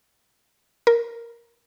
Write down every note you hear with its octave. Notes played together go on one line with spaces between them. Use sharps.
A#4